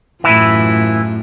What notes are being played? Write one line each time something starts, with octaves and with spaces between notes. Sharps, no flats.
F#2 A2 E3 E4 F4